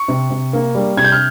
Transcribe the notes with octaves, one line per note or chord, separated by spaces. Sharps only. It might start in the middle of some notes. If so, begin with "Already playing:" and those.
Already playing: C#6
C3
C3
A#3
G3
C3 G#6
G6
F6